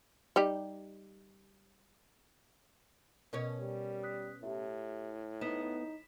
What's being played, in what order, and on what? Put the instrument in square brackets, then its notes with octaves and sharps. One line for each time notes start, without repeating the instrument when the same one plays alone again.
[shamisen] G3 D#4 G4
[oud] B2 C#4 C#5 [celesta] A#4
[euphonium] G3
[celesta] D#6 F#6 B6
[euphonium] A2 [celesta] E4 G4 E5
[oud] B3 [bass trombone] D#4 [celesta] B6 E7